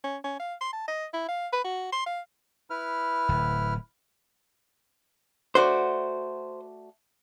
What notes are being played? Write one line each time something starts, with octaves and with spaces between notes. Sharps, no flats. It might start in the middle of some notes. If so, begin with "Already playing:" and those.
C#4
C#4
F5
C6
A5
D#5
E4
F5
B4
F#4
C6
F5
E4 B4 F6
D1
A3 F#4 C5 D5